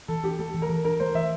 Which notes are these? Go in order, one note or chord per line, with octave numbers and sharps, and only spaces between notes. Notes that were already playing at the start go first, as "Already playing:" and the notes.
E3 A4
D4 G4
A3 A4
E3
A#4
E3
D4 A#4
A3 C5
E3 E5